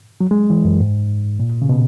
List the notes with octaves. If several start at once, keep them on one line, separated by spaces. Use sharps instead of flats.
F#3
G#3
E3
F#2
G#2
A#2
C#3
B2